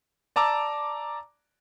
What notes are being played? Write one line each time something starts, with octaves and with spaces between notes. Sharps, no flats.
D5 A5 A#5 D6 E6